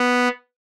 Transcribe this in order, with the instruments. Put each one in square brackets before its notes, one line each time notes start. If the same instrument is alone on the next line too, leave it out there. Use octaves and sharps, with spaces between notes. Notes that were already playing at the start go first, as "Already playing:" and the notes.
Already playing: [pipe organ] B3